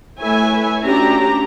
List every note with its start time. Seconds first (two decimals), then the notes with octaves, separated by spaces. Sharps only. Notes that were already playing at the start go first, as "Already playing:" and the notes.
0.20 A3 E4 B4 C#5 E5 G#5
0.84 A3 C#4 D4 F#4 G4 A#5